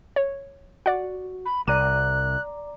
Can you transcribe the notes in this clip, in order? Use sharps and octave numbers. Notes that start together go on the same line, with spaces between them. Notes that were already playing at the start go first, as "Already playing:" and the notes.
C#5
F#4 D5 F#5
B5
C2 D5 A#5 D6 F#6 D#7